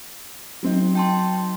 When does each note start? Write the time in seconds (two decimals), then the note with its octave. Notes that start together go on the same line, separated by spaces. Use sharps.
0.63 F#3 C4 D#4
0.95 G5 A5 C6